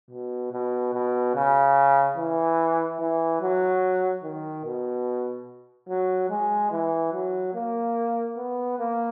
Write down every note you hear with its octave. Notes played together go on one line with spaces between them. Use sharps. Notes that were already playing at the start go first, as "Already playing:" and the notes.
B2
B2
B2
C#3
E3
E3
F#3
D#3
B2
F#3
G#3
E3
F#3
A#3
B3
A#3